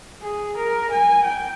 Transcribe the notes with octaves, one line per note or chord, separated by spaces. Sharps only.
G#4
A#4
G#5
G5